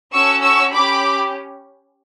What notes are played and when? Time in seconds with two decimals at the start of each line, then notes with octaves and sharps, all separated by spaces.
0.12 C#4 F#4 A4 C#6 E6
0.42 C#6 E6
0.72 C#4 G4 B5 D6